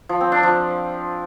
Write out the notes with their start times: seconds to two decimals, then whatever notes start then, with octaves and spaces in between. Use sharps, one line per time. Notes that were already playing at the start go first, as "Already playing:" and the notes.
0.09 F3
0.21 C4
0.32 D4
0.43 F3